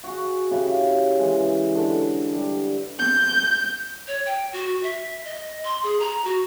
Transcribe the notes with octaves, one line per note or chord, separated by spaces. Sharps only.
F#4 G#4
C#3 E4 G4 B5
E3 G#3
D3
G3
G6
C#5
G5
F#4
E5
D#5
C6
G#4
A#5
F#4